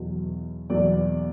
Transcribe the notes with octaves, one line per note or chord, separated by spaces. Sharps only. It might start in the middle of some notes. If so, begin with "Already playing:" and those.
Already playing: E2 B2 F#3
E2 B2 F#3 D5